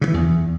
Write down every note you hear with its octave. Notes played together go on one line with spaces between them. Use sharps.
C#3
E3
E2